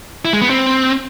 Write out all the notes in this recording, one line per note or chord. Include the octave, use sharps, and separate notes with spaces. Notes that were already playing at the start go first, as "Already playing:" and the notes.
E4
G#3
B3
C4